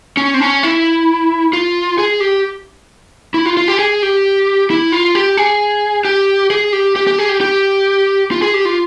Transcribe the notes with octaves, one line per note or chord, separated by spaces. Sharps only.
C#4
C4
C#4
E4
F4
G#4
G4
E4
F4
F4
G4
G#4
G4
E4
F4
G4
G#4
G4
G#4
G4
G4
G4
G#4
G4
G4
F4
G#4
G4
F4